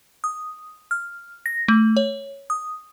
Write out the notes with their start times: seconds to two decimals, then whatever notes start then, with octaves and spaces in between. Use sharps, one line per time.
0.24 D#6
0.91 F6
1.46 A#6
1.68 A3
1.97 C#5
2.50 D#6